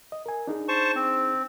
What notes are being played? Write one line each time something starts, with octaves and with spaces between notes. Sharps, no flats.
D#5
A#4 G#5
D4 D#4 G#4
C5 A5 C#6
C4